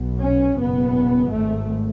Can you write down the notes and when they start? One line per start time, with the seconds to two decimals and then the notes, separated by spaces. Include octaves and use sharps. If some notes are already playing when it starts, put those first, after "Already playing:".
Already playing: B1 B2
0.22 C#4
0.58 F#1 E2 B2 B3
1.32 G#1 G#2 A3